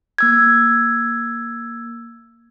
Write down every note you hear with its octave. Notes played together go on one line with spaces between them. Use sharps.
A#3 E6 G#6